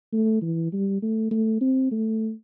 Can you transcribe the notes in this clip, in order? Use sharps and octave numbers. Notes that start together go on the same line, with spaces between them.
A3
E3
G3
A3
A3
C4
A3